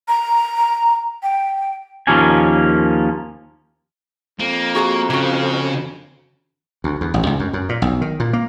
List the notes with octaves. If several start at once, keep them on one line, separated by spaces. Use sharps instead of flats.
A#5
G5
D#2 F3 A#3 C#4 G#5
F2 A#3
F#4 G#4 A#5
C#3 A#3 F#4
D2
E2
A1
C#2
F#2
F#2
A#2
B1
D#3
A#2
A#3